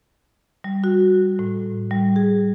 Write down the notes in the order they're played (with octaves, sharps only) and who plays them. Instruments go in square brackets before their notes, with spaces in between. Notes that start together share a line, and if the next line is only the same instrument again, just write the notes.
[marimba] G3
F#4
A2
G3
G#4